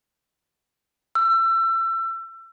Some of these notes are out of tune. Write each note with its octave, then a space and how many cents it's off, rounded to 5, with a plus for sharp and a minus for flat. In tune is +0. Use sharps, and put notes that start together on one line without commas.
E6 +30